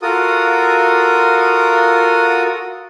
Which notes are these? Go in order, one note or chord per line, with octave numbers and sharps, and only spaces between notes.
F4 F#4 A4 A#4 D#6